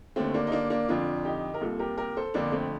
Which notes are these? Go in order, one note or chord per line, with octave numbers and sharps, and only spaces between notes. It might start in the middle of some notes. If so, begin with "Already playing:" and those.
D#2 D3 A3 C4
A#3 D4
D#4
A#3 D4
A#3 D4
F2 D3 D4 F4
D#4 G4
A#4
C2 A#2 F4 A4
G4 A#4
G4 A#4
A4 C5
F2 D3 A#3 D4
A3 C4